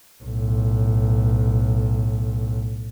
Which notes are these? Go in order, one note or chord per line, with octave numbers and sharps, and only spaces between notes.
B1 A2